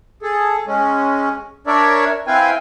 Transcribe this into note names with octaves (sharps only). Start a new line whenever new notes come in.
G#4 A4
G#3 C#4
D4 A#4 C#5 D5 E5
C4 E4 B4 F5 G5 G#5